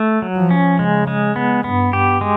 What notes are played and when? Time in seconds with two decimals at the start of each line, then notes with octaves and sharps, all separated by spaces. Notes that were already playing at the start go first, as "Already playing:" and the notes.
Already playing: A3
0.22 F#3
0.36 F3
0.51 C#4
0.79 C#3 G#3
1.07 G#3
1.36 B3
1.64 G2 B3
1.93 G4
2.21 G#3